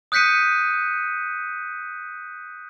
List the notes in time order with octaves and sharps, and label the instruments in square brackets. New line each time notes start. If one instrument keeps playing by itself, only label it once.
[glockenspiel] D#6 F#6 G6 B6 C#7 D#7